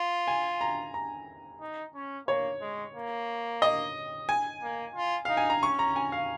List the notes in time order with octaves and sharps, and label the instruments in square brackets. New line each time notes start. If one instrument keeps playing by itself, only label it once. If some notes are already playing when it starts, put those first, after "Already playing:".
Already playing: [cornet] F4
[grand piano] G#5
A#5
A#5
[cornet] D#4
C#4
[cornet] A#3 [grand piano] C#5
[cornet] G#3
A#3
[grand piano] D#5
G#5
[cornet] A#3
F4
[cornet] D#4 [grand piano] F5
[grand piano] G#5
A#5
[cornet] C#4 [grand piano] C#6
[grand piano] A#5
G#5
F5